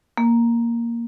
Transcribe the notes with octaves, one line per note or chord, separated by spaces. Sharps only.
A#3